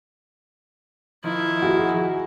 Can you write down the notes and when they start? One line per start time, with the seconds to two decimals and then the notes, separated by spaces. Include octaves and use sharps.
1.24 D#3 F3 E4
1.62 F#4 G#4